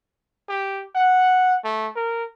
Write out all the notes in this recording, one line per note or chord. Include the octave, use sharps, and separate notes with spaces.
G4
F#5
A3
A#4